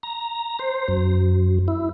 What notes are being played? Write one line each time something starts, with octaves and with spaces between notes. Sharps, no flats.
A#5
C5
F#2
E4